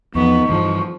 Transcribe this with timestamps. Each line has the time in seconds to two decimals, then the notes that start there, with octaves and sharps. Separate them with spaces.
0.15 E2 F3 B3 D#4 C#6
0.50 G2 E3 F3